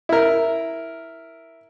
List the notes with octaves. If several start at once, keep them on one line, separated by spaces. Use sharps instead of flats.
E4 A#4